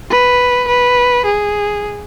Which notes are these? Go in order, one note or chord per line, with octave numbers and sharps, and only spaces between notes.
B4
B4
G#4